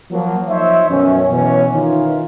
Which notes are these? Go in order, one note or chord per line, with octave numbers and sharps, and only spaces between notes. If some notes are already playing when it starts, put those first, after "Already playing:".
F3 F#3 A#3
F3 D#4 C5 C#5 E5
F#2 B2 D#3 E3 F#3 C#4
B2 E3 C#4
D#3 E3 D#4 F4